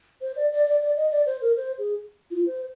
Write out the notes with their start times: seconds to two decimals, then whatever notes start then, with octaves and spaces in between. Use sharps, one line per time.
0.21 C5
0.36 D5
0.52 D5
0.66 D5
0.81 D5
0.96 D#5
1.11 D5
1.26 C5
1.42 A#4
1.56 C5
1.79 G#4
2.31 F4
2.46 C5